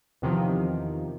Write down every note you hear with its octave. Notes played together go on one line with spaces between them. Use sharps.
E2 C3 D#3 F3